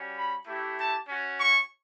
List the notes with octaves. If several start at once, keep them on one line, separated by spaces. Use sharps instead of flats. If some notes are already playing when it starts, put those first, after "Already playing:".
Already playing: G3 C#4 F#4
B5
A3 E4 G4
A5
C#4 F#4
C#6